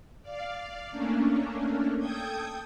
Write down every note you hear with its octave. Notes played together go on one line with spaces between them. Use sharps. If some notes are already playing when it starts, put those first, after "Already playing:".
D5 F5
A3 A#3 C#4 D4
A4 G5 D#6 G6 G#6